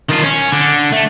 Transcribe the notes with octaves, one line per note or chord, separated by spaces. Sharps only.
D#3 F4
C#4
D3
A3